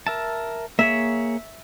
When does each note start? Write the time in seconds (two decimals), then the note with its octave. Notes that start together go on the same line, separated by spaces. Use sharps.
0.07 A#4 E5 A5
0.79 A#3 G#4 C#5 E5